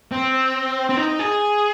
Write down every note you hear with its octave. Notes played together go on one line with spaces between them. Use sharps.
C4
C4
D#4
G#4